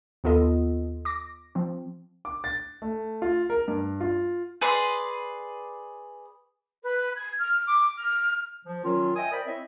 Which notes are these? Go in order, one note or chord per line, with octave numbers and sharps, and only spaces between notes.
D#2 B3 F4 A4 D#5
D6 A#6
F3 C4
D6
A6
A3
F4
A#4
G2
F4
G#4 B4 D5 C6
B4
G#6
F6
D6
F6
F3
D#3 F#3 C#4 F4
D#5 E5 G5 G#5 D#6
A#4 C5 D5 G5 B5
C4 E4 C#5 D#5 E5